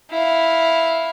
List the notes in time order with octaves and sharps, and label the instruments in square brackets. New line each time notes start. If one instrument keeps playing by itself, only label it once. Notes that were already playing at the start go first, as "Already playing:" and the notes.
[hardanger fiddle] E4 F5